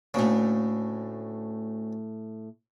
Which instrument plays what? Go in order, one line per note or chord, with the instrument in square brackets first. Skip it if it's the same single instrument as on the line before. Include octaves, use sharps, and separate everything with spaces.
[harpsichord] D2 C#3 [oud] A2 A#3